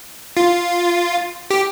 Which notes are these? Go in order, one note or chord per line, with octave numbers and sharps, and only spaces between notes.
F4
G4